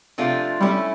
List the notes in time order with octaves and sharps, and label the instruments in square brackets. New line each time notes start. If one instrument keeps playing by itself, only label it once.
[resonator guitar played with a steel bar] C3 F3 A3 D4 F4
[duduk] G3 [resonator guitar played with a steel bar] A3 C#4 E4